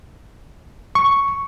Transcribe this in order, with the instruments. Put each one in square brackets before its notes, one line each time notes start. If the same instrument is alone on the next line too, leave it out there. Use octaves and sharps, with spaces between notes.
[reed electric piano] C#6